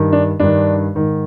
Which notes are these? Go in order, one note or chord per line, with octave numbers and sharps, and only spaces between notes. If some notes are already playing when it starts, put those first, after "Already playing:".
Already playing: G2 D#3
D4
G2 D#3 D4
G#2 D#3